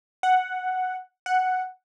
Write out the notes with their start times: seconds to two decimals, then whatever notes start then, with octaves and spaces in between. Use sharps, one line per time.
0.23 F#5
1.26 F#5